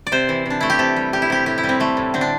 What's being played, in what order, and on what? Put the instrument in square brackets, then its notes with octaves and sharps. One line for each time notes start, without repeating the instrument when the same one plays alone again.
[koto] D5
C3 C5
E3
C3 D4
A3 E4
G4
C3 A4
G3
G3 G4
E4
C3 G4
A2 G4
E4
G3
C4
G3 A3
A2
D3 C4
D4